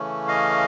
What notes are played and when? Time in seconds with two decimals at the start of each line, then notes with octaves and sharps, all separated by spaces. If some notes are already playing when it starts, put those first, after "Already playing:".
Already playing: C#3 E3 A3 C#4
0.28 D#5 F5